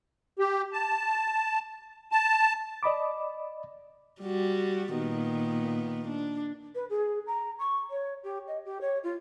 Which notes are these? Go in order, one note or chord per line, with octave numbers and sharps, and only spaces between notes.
G4
A5
A5
D5 D#5 B5 D6
G3 F#4
A#2 D#3 B3
D4
B4
G#4
A#5
C#6
C#5
G4
D#5
G4
C#5
F4